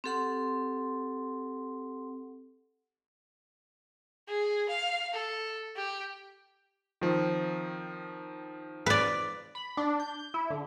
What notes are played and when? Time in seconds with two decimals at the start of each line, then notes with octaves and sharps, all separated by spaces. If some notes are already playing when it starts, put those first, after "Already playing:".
0.04 C4 G4 A4 F#5 C6
4.28 G#4
4.69 F5
5.13 A4
5.77 G4
7.01 D#3 F3 C4
8.86 B4 D5
9.55 B5
9.77 D4
10.00 G6
10.34 E4
10.50 D3